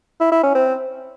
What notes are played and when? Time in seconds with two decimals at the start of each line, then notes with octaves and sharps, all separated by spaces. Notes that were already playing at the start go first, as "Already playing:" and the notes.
0.20 E4
0.32 E4
0.43 C#4
0.55 C4